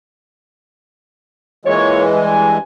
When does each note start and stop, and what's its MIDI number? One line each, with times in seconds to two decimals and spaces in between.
1.65 2.58 52
1.65 2.58 56
1.65 2.05 58
1.65 2.05 65
1.65 2.05 73
2.13 2.58 43
2.13 2.58 80